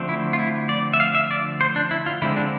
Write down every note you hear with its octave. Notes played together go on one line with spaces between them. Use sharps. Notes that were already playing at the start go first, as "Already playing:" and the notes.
Already playing: D3 F3 A3 C4
E4
F4
E4
D5
E5
F5
E5
D5
C5
D4
E4
F4
D3 G#3 C4 E4
D4